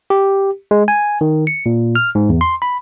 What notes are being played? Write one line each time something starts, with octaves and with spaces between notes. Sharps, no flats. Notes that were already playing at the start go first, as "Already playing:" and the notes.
G4
G#3
G#5
D#3
C#7
A#2
F6
G#2
E2
C6
B5